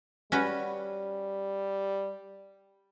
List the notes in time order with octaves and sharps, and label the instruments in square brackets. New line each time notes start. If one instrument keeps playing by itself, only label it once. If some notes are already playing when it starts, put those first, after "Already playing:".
[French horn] G3 [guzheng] C#4 F#4 B4